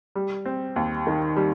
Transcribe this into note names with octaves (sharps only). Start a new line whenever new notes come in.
G3
C4
D#2
D#3
G3